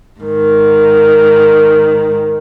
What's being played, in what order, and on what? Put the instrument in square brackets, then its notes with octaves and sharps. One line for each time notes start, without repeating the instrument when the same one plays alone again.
[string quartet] G#2 D#3